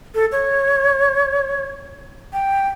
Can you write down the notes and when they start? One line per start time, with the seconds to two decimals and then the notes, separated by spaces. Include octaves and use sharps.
0.15 A4
0.32 C#5
2.33 G5